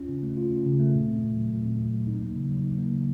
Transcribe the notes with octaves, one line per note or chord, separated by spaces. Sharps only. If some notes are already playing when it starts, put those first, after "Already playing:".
Already playing: C#4 F4
C#3
A3
F4
C#4
C#3
A3
A#2
C4
A#2
F#3
A#2
C4
A#2
F#3
D#4
A#3
C#3
F#3
D#4
A#3
C#3